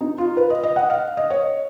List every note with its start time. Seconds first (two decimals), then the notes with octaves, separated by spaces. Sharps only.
0.01 D#4
0.18 F4
0.37 B4
0.50 D#5
0.63 D#5
0.76 F#5
0.90 F5
1.17 D#5
1.30 C#5